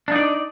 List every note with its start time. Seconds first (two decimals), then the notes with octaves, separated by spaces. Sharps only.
0.08 D4
0.12 D#4
0.16 D5